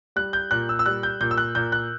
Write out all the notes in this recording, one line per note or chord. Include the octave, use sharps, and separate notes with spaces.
G3 F#6
G6
A#2 F#6
E6
E6
G3 F#6
G6
A#2 G6
E6
F#6
A#2 G6
F#6